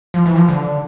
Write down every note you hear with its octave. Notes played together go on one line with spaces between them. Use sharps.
F3
E3
F3
D3